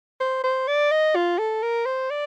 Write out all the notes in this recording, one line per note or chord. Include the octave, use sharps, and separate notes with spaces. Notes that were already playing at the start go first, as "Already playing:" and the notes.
C5
C5
D5
D#5
F4
A4
A#4
C5
D5